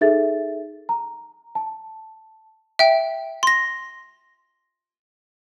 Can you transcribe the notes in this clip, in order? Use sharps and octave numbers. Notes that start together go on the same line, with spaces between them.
D#4 G#4 A4 E5 A6
A#5
A5
E5 G5
C6 A#6